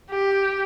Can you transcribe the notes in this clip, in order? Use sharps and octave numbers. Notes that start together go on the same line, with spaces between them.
G4